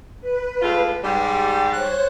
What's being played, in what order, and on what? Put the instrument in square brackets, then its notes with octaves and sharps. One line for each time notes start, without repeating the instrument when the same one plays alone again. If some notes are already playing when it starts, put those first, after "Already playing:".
[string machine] B4
[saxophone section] A2 G#3 F4
[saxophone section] G#2 G3 [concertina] G4 [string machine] A6
[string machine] C5 C#5 [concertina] F#6